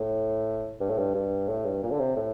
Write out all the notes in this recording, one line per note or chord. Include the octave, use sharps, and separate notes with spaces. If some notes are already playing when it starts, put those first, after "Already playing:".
Already playing: A2
G2
A2
G2
G2
A2
G2
A#2
D3
C3
A2